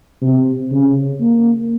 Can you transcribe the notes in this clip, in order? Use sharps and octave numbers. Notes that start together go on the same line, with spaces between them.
C3
C#3
A#3